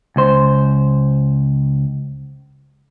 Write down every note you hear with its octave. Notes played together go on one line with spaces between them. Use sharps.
C#2 C5